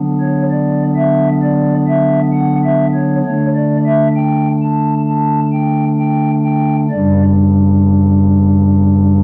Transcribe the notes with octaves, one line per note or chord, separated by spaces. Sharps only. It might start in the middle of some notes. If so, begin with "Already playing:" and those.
Already playing: D3 F#3 B3 D4
C#5
D5
E5
D5
E5
F#5
E5
C#5
D3 A3 D4 C#5
D5
E5
G5
A5
A5
G5
G5
G5
F#2 C#3 G3 D4 D5